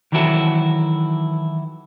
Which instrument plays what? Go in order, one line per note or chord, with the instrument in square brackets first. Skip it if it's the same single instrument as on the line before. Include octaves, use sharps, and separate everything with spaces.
[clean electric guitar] D#3 E3 F#3 E4 F#4 A4